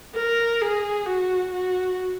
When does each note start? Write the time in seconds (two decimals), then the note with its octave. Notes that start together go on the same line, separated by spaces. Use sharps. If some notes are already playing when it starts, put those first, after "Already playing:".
0.15 A#4
0.62 G#4
1.06 F#4
1.51 F#4